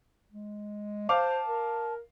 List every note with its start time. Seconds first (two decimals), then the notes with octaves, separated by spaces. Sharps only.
0.31 G#3
1.09 C5 F5 A5 D6 F7
1.47 A#4